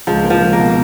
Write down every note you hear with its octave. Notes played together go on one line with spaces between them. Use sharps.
C#2 F3
A#3
F3
C#2
A#3
B2